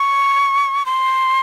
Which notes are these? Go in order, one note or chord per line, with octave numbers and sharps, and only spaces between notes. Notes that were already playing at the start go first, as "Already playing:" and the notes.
Already playing: C#6
C6